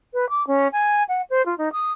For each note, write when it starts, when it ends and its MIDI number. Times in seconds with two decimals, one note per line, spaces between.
0.14 0.29 71
0.30 0.45 86
0.47 0.68 61
0.72 1.03 80
1.09 1.22 78
1.30 1.45 72
1.46 1.57 65
1.58 1.69 63
1.73 1.92 87